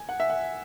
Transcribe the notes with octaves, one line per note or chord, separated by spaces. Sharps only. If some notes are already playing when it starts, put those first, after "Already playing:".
Already playing: G#5
F#5
E5
F#5